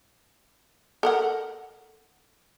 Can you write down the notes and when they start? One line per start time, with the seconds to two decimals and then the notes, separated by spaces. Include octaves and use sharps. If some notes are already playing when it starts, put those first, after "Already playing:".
1.03 A4 A#4 F#5